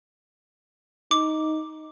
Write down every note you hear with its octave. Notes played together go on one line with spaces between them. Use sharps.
D#4 D6